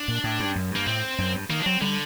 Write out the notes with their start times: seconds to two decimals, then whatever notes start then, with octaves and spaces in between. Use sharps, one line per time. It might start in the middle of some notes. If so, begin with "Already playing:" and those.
Already playing: D4
0.08 A#2
0.24 A2
0.40 G2
0.55 F#2
0.71 G2 A#3
0.87 A2 C4
1.18 F#2
1.34 G2
1.50 D#3 A#3
1.60 D4
1.66 F#3 C4
1.81 D3 G3